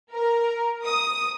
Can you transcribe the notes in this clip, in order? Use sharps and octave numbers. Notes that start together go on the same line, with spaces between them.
A#4
D#6